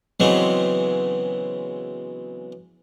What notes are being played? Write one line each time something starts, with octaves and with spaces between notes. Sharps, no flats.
C#3 E3 F#3 G#3 B3 C4